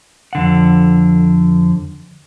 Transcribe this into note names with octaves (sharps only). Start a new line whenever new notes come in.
F2 D3 F#5